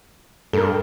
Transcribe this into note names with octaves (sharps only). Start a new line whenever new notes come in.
G2 A4 A#4